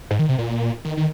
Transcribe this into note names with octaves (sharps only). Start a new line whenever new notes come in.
G#2
D#3
C3
A#2
D#3
D#3